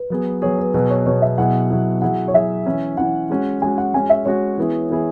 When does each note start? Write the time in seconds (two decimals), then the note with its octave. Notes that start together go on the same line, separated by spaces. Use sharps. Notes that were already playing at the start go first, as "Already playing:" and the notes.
Already playing: B4
0.10 F#3 B3 G#4
0.42 F#3 B3 G#4 C#5
0.58 B4
0.74 B2 F#3 B3 G#4 B4
0.90 C#5
1.06 B2 F#3 B3 G#4 C#5
1.22 E5
1.38 B2 F#3 E4 G#4 F#5
1.70 B2 F#3 E4 G#4
2.02 F#3 E4 G#4 F#5
2.28 C#5
2.34 F#3 E4 G#4 E5
2.65 E3 C#4 E4
2.97 E3 C#4 E4 F#5
3.30 G#3 C#4 F#4
3.62 G#3 C#4 F#4 G#5
3.78 F#5
3.94 G#3 C#4 F#4 G#5
4.10 E5
4.25 G#3 C#4 F#4 C#5
4.57 E3 B3 E4 G#4
4.90 E3 B3 E4 G#4